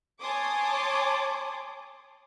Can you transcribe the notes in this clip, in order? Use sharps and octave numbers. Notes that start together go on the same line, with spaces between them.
C#5 G#5 A5 C6 D6 D#6